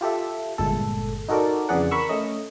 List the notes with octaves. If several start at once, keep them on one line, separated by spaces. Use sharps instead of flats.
F4 G4 A4 E5
G1 A#2 G#3 A4
D#4 F#4 A4 A#4 D5
F2 C#3 E3 G#4 D5 F#5
A#4 B5 C#6 E6
A3 C#4 D#5